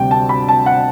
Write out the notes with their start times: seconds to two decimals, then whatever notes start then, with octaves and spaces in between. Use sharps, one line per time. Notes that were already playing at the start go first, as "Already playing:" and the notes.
Already playing: D2 C3 G3 G5
0.11 A5
0.29 B5
0.48 A5
0.66 F#5